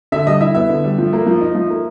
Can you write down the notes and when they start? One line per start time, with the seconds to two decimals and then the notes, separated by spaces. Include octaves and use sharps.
0.12 D3 E5
0.27 G3 D#5
0.41 E4 E5
0.55 B3 E5
0.69 D3
0.84 G3
0.98 F3
1.13 A#3
1.27 F3
1.41 D#4
1.55 F3
1.70 A#3